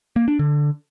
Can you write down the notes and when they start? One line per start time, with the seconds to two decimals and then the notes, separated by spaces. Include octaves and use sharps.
0.16 A#3
0.28 D4
0.39 D3